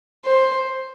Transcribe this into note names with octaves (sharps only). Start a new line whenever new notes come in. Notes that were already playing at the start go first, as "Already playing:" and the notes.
C5